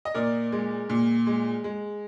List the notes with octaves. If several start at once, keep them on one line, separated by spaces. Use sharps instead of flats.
D#5
A#2 A#4 D5
G#3
A#2
G#3
G#3